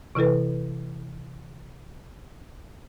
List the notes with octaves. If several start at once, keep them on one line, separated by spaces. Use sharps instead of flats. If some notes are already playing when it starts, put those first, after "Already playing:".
C3 E3 E4 A4 B4